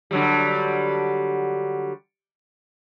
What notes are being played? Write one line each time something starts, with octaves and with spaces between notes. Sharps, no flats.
D3 F#3 G3